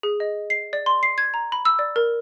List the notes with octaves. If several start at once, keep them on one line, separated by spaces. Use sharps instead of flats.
G#4
D#5
C7
D5
C6
C7
G#6
A#5
B5
E6
D5
A#4